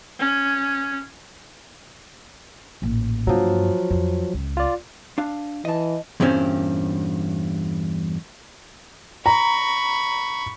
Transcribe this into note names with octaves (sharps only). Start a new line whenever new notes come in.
C#4
A1 A#2
G2 F3 F#3 A#3
F2
C#2
F4 D5
D4 F5
E3 D#5 A5
E2 G2 A#2 C4 C#4
A#5 B5 C#6